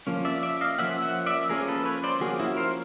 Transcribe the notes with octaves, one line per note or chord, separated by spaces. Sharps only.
F3 A#3 C#4
D5 E5
D5 E5
D#5 F5
F3 A#3 C#4 E5 F#5
E5 F#5
D5 E5
F3 A#3 C#4 G#4 A#4
A4 B4
B4 C#5
C5 D5
F3 A#3 C#4 F#4 G#4
E4 F#4
A#4 C5